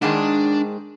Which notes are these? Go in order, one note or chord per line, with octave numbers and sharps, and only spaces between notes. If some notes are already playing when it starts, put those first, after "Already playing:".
G#2 D#3 G#3 D4 A5